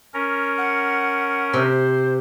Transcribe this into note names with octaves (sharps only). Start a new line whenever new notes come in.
C#4 A#4
F#5
C3 C5